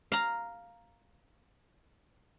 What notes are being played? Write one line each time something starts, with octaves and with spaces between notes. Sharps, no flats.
F5 A#5